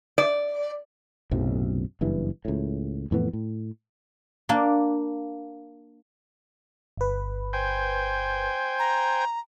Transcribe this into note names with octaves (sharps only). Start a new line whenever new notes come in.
D5
B1 F#2 A2 C3
F#1 G2 E3
C#2 A2
F2 A2 E3 B3
A2
A#3 D4
G1 B4
C5 G5 G#5
A#5